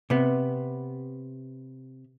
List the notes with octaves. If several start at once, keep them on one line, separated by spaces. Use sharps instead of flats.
C3 B3